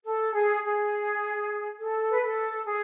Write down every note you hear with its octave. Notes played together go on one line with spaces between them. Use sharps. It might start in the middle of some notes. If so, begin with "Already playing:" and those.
A4
G#4
G#4
A4
B4
A4
G#4